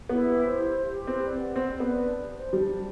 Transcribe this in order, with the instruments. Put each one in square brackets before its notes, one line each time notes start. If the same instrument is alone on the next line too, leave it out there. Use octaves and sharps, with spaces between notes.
[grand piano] B3 [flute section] E4
[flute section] G4
C5
E4
E4
G4
[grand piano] C4 [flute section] B4
[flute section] D5
F#5
[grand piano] C4 [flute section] B4
[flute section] B4
[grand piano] B3
[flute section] D5
D4
G4
C5
[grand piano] G3 [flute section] D4
[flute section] D4